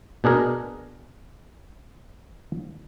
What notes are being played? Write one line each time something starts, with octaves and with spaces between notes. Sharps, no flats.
B2 D4 G#4 A#4